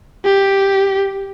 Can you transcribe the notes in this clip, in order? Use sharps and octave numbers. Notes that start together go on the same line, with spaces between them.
G4